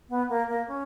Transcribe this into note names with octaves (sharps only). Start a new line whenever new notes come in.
B3
A#3
A#3
C#4